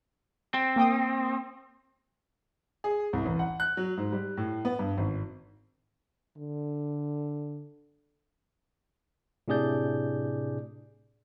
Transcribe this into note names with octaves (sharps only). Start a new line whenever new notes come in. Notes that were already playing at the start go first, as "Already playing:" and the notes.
C4
A#3 G5 D#6
G#4
C2
A1
F#5
F#6
F#3
G#2
G3
A2
B3
G2
G#1
D3
A2 C3 D4 G#4 D5 G6